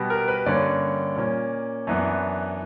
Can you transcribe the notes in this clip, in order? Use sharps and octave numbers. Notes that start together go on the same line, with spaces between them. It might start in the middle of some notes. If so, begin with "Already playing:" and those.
Already playing: B2 G3 B3
A#4
B4
G2 D3 A#3 C#4 D5
A#2 A#3 C#4
F#2 E3 B3 D4